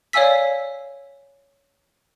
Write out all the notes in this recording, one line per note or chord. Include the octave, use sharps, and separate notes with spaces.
C#5 D5 F5 G#5 E6 B6